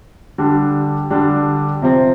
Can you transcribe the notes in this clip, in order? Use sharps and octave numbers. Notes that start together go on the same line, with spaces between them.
D3 G3 D4
D3 G3 D4
C3 F3 C4